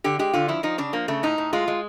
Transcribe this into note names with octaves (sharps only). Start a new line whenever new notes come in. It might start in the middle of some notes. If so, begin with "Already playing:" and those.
D3 G4
G#3 G4
D3 F4
F3 E4
F3 D#4
C#3 D4
F3 A#3
C#3 A3
A2 D#4
A2
G#3 F4
G#3